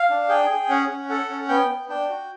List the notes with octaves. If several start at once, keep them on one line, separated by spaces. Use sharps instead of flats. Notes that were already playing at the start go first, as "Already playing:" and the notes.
Already playing: F5
D4
G#4 G5
G#4
C#4 F#5
C#4
A4 F#5
C#4
B3 G5
B3
D4 G5
F#4